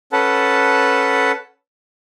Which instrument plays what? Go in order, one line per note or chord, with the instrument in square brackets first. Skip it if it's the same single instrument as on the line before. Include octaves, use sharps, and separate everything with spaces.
[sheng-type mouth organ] C#4 A4 B4 F#5 A5